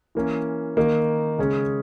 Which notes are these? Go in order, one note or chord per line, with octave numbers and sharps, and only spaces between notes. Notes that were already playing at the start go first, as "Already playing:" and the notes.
E3 A#3 C#4
D#3 A#3 D#4
C#3 G#3 C#4 G#4